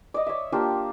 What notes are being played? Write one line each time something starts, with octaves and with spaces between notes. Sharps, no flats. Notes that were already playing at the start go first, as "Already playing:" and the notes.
D5 D#5
C#5 E5
A#3 D4 F4 G4